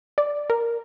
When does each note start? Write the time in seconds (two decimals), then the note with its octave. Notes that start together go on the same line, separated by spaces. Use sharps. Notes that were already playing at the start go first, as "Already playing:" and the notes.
0.18 D5
0.50 A#4